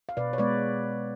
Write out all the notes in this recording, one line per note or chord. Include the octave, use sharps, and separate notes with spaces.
F5
B2 B4 D5
C#5
G#3 B3 B4 D5